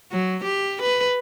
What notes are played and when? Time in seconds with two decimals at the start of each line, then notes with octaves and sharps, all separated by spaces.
0.12 F#3
0.44 G4
0.82 B4